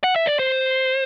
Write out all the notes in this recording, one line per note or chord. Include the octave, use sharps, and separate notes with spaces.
F#5
E5
D5
C5